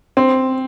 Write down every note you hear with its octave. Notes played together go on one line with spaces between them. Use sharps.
C4